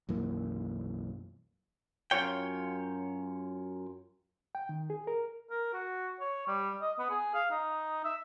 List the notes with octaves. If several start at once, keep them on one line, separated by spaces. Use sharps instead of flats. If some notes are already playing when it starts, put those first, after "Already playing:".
B1 F#2 E3 A#3
F#2 F4 C#5 G5
G5
D#3
G#4
A#4
A#4
F#4
C#5
G3
D#5
B3
G#4
F5
D#4
E5